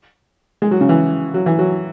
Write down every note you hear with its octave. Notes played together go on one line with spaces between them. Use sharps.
G#3
F#3
C#3
E3
F#3
E3
F#3